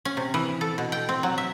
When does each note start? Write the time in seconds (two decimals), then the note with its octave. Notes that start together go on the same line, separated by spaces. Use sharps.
0.05 C#4
0.17 C3
0.34 E3
0.61 A4
0.78 B2
0.92 G5
1.09 C4
1.23 F#3
1.38 E5